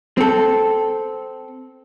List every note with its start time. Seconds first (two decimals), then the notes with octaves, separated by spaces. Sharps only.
0.18 C4 A4